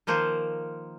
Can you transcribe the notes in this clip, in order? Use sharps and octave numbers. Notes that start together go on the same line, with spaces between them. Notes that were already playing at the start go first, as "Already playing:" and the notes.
D#3 F3 A#3 C5